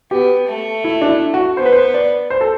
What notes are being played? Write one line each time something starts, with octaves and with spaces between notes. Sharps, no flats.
B3 G4
A3
E4
D4
E4
F#4
B3 C5
B4
C5
D5
C5
A4